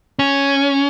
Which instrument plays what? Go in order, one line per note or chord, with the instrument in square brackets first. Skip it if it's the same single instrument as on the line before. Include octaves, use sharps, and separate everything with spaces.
[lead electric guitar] C#4